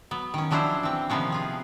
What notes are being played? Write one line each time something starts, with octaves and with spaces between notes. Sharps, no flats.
F#3 B3
D#3 C#4
F3 F#3 D4 E4 C5
E3 C4
C3 D#3 F3 B3 C#4
F4 G#4